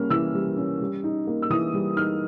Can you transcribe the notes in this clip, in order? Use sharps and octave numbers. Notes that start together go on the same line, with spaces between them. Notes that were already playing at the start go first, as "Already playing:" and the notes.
Already playing: G3 A#3 C#4 F6
E3 E6
G3
C#4
G3
D#4
A#3
E6
E3 D#6
G3
D#4 F6